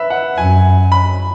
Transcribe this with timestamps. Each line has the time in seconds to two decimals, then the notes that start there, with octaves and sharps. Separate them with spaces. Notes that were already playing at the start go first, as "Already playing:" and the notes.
Already playing: B4 E5
0.10 F#5
0.38 F#2 G#5
0.92 B5